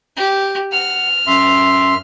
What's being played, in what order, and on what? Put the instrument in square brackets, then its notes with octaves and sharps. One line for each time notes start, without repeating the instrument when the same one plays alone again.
[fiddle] G4
[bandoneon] F#5 [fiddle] F6
[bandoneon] F#2 E5 C6